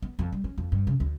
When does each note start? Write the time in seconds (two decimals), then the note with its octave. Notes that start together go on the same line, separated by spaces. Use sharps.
0.02 B3
0.19 F2
0.32 G3
0.44 C#4
0.58 F2
0.72 G2
0.87 C#3
1.00 D2